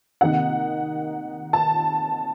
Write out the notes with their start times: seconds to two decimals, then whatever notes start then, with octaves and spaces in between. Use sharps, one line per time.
0.21 C3 D#3 A#3 D#4 F#5
1.53 A5